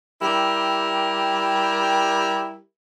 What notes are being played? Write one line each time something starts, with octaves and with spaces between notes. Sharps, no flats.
G3 E4 G4 A#4